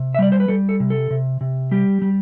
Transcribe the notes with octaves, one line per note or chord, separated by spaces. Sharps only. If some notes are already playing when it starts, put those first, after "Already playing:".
Already playing: C3
E5
G3 D5
C5
B4
G3 A4
A4
C3
A4
C3
C3
G3 G4
G3